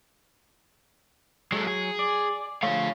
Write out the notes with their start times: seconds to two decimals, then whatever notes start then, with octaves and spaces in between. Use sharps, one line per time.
1.52 F#3 G#3 A3
1.67 G#4
1.99 D5
2.63 D3 F3 A3 C#5 F5